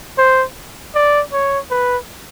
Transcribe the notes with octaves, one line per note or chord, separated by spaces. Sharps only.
C5
D5
C#5
B4